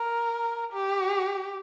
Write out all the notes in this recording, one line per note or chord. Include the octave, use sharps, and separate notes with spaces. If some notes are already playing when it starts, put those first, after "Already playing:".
Already playing: A#4
G4